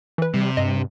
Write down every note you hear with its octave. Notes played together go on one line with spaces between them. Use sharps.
E3 B4
C3 G3
G2 D#5